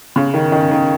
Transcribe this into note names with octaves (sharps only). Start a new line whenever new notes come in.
C#3
D#3
D#3
D#3